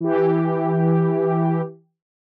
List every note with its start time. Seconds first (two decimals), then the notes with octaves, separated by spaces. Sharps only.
0.01 E3 G4